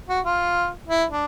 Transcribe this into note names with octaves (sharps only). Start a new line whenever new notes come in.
F#4
F4
E4
D4